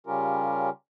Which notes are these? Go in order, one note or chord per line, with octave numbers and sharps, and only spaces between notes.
C#3 G3 C#4 F4 G4 A#4